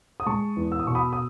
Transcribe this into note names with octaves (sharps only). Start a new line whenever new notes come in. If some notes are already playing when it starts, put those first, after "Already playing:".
D#6
G#3 A5 C#6
E2
E6
D#6
B2 C#6
B5 D#6
D#6